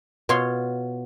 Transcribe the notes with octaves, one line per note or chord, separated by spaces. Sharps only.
B2 F4 C#5 C6